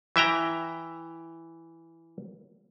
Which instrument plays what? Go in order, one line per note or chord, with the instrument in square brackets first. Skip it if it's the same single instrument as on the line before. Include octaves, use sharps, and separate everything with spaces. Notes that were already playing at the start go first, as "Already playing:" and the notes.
[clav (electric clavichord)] E3 E5 G5 A#5